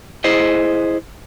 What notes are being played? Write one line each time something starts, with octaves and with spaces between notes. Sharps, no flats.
E4 G#4 C5 D#5